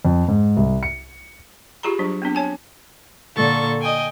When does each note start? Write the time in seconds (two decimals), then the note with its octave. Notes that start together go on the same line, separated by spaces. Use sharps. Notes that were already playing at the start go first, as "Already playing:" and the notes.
0.05 F2
0.28 G#2
0.57 C2
0.83 C#7
1.83 F4 G4 G#4 A#5 B5
1.99 F#3 G3 D4
2.22 B3 C4 D4
2.35 C#5 G#5 A5
3.35 A#2 D3 A4 C#6 A6
3.80 D#5 G5 G#5